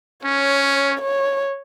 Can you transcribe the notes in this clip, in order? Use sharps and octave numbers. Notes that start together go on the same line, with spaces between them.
C#4 C#5
C#5